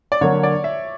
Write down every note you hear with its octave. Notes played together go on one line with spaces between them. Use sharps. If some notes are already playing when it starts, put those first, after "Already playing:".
D5
D3 F#3 A#3 C#5
D5
E5